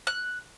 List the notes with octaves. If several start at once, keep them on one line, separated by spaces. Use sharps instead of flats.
F#6